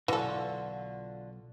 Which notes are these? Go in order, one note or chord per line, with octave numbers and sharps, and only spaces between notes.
B1 G#2 D3 E3 F4 F#4 A4